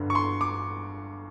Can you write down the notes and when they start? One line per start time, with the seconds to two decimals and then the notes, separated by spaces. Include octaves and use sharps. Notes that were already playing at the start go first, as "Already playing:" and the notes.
Already playing: G1 G2 D3
0.10 C#6
0.15 C6
0.41 D6